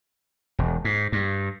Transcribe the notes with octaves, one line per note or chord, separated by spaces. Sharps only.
E1
G#2
G2